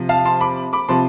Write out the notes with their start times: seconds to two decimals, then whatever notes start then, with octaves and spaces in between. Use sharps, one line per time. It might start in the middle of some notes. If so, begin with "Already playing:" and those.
Already playing: C3 F3
0.09 F5 A5
0.25 A5 C6
0.41 B5 D6
0.73 B5 D6
0.88 C3 F3 A5 C6